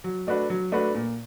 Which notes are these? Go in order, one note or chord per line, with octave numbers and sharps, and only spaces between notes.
F#3
A3 D4 F#4 B4
F#3
A3 D4 F#4 B4
A#2